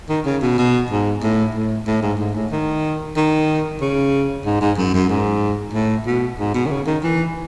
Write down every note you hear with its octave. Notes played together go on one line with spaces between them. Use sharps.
D#3
C#3
B2
B2
G#2
A2
A2
A2
G#2
G#2
A2
D#3
D#3
C#3
G#2
G#2
F#2
F#2
G#2
A2
B2
G#2
B2
D#3
C#3
D#3
E3